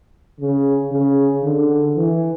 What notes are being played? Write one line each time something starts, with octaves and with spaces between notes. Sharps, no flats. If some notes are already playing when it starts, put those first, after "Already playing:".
C#3
C#3
D3
E3